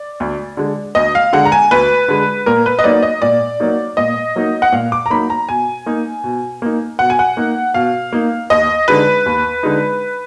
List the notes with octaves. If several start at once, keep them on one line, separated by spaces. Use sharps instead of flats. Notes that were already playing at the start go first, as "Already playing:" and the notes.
Already playing: D5
D2
D3 G#3
D2 D#5
F5
D3 G#3 F#5
A#5
G#5
D2 B4
D3 G#3
A#2 A#4
B4
D#5
F#3 A#3 D#4 D5
D#5
A#2 D5
F#3 A#3 D#4
A#2 D#5
F#3 A#3 D#4
F#5
A#2 F5
D6
A#5
F#3 A#3 D#4 B5
A#5
B2 G#5
A#3 D#4
B2
A#3 D#4
B2 F#5
G#5
F#5
A#3 D#4
B2 F5
A#3 D#4
D#2 D#5
D3 G#3 D#4 B4
D#2
D3 G#3 D#4